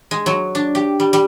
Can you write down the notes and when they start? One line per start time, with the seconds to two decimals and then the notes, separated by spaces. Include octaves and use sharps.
0.11 G#3
0.26 F#3
0.55 D4
0.75 G4
1.00 G3
1.13 G3